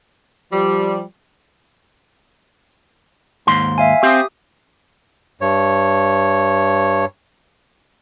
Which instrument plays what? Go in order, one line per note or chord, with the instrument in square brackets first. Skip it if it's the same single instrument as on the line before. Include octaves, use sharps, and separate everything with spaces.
[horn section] F3 G3
[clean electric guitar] D#2 G#2 C6
[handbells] E5 F5 G#5
[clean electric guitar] C4 C5 [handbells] G4 D#6
[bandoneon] G2 C#5